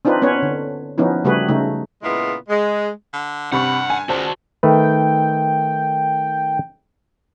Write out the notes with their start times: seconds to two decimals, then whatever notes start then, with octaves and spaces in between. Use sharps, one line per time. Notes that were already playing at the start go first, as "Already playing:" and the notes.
0.05 C4 D4 D#4 F4 B4
0.22 B3 C#4 B4 C#5
0.42 D3
0.98 F3 B3 C#4 D#4 E4
1.24 C#3 G3 A3 F#4 G#4 B4
1.48 C#3 A3 D#4
2.03 A#2 C#3 G#3 B3 E4 F4
2.49 G#3
3.13 D3
3.52 G2 C3 F#5 B5 C#6
3.90 G#5
4.09 C#2 F#4 C5 D5 A5
4.63 D#3 A3 B4 G5